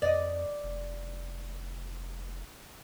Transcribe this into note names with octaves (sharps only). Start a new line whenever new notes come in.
F2 D5 D#5
F1